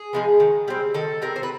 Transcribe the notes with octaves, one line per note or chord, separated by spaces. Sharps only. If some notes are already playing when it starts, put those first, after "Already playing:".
Already playing: G#4
F3 G#3 B3
D#3
G3 C4
D#3 A4
G3 C4 A#4
C5
B4